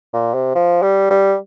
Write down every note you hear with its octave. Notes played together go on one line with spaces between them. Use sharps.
A#2
C3
F3
G3
G3